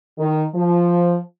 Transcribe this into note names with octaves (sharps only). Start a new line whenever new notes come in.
D#3
F3